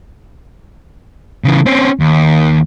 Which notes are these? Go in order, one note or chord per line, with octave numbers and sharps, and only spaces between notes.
C#3 E3
C4 C#4
D#2